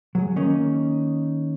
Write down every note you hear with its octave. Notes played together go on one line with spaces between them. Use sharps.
F#3 G#4
D#3 A#3 C#4 D#4